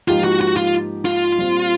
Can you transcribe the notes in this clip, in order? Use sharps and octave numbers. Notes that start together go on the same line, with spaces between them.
G#2 F3 A#3 D#4 F4 G4
F#4
F#4
F4
F4
A#2 G3 C4